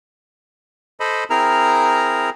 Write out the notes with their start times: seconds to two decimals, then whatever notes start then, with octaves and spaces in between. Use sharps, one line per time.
1.00 A4 C5 D#5 B5
1.30 C4 E4 G#4 A#4 A#5 F6